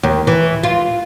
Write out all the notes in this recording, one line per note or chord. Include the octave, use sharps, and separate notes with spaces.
D#2
E3
F4